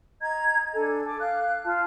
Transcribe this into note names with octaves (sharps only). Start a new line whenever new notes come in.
D#5 A#5 G#6
D4 A4 G#5
D6
F5 F#6
F4 A5